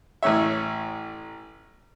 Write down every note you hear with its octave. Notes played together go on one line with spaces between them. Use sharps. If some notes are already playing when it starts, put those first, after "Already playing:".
A1 A2 C#5 E5